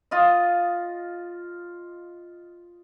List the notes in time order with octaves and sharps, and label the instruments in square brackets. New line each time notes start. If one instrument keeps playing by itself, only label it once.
[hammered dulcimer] F4 D#5